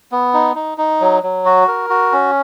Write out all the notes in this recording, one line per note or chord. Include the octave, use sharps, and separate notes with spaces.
B3
D#4
D#4
D#4
F#3
F#3
F#4
A#4
F#4
C#4